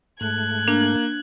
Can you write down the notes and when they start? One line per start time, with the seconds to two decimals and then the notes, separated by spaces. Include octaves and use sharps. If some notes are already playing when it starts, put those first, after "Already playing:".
0.21 G#2 A3 F#6 G#6
0.68 A#3 D4